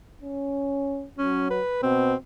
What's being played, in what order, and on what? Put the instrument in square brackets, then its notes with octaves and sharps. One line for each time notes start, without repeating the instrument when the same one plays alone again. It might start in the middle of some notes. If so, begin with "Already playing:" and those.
[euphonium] C#4
[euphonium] F#3 [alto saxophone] C#4
[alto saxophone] B4
[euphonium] B2 [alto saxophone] C4